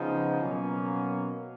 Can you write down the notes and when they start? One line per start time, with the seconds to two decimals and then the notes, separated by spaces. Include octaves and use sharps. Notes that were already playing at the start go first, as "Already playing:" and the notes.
Already playing: C#3 F3 B3 D#4
0.41 B2 F#3 A#3 C#4